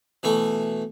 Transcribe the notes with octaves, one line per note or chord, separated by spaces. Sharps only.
B2 E3 A3 C#6